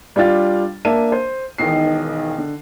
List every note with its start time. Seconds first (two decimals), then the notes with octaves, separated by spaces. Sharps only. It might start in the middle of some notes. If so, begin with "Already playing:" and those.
0.16 G3 D4 F4 A6
0.85 A#3 D4 E5 A5 D#7
1.12 C5
1.58 E1 B1 D#3 C7
2.38 D3